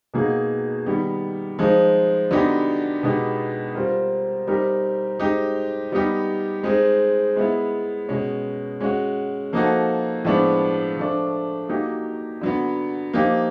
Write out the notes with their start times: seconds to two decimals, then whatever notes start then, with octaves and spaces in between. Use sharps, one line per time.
0.14 B2 F#3 A#3 D#4 G#4
0.86 D#3 G3 B3
1.59 F3 G#3 C4 D#4
2.31 D3 F#3 B3 D#4 G4
3.03 B2 G#3 B3 D#4 G4
3.75 G3 C4 F4 A#4
4.47 G3 C4 D#4 G4 A#4
5.20 G#3 C4 D#4 G4
5.92 G3 B3 D#4 G4
6.63 G#3 C4 D#4 G#4
7.36 G#3 B3 E4
8.09 B2 G#3 C#4
8.80 G#3 C#4 F#4
9.53 F3 A#3 D#4 F#4 A4
10.25 A2 F3 G#3 B3 D4
10.97 F3 A3 D4
11.69 F#3 A#3 D#4 G4
12.41 D3 F#3 B3
13.13 F3 A#3 D#4 G4